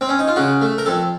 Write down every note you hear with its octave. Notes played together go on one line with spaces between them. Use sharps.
C4
C#4
D#4
F4
C#3 F#4
A3
A#4
F2 A4